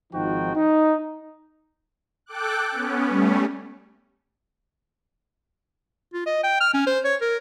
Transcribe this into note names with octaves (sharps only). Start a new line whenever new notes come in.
G#1 F3 D#4 F#4 G5
D#4
A4 G5 D6 F#6
B3 C#4
G3 A3 C#4
F4
D#5
G5
F6
C#4
C5
C#5
A#4